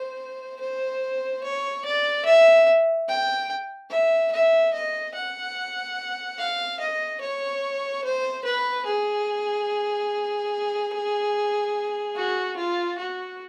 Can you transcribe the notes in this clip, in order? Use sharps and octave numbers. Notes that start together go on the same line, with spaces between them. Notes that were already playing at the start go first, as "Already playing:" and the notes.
Already playing: C5
C5
C#5
D5
E5
G5
E5
E5
D#5
F#5
F5
D#5
C#5
C5
B4
G#4
F#4
F4
F#4